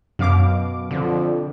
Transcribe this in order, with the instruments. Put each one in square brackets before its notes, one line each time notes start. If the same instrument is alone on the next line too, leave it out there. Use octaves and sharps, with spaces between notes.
[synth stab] F#2 F5 D6 [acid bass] B2
[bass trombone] F2 [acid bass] D3